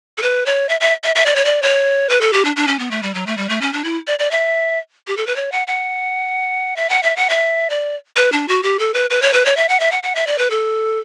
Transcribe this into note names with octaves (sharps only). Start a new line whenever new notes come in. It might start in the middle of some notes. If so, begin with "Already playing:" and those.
A4
B4
C#5
E5
E5
E5
E5
D5
C#5
D5
C#5
B4
A4
G4
D4
D4
C#4
B3
A3
G3
F#3
A3
G3
A3
C#4
D4
E4
D5
D5
E5
G4
A4
B4
C#5
F#5
F#5
E5
F#5
E5
F#5
E5
D5
B4
D4
F#4
G4
A4
B4
B4
C#5
B4
C#5
E5
F#5
E5
F#5
F#5
E5
D5
B4
A4